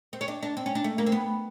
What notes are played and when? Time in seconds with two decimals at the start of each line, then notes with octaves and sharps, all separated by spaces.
0.13 C4
0.21 C#4
0.28 D4
0.43 D4
0.57 C4
0.66 C#4
0.75 D4
0.84 A3
0.98 A#3
1.06 C4
1.12 B3